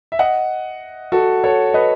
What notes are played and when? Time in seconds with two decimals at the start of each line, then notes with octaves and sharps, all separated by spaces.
0.12 E5
0.19 D#5 F#5
1.12 F#4 A4
1.44 A4 C#5
1.74 B4 D#5